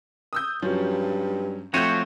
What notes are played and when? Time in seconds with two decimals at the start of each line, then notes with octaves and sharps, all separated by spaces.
0.33 D#6 E6 G6
0.62 G2 F3 F#3 C#4
1.74 F3 A3 C4 F#4 C#5 E5 G6 D#7